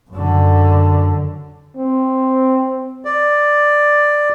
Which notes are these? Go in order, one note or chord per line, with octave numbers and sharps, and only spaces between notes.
F#2 D3
C4
D5